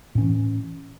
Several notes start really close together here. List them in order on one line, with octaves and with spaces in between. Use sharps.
A2 C#4 E3